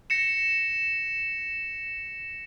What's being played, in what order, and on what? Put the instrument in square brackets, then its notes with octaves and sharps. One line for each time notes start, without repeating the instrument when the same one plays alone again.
[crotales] A#6 C#7 E7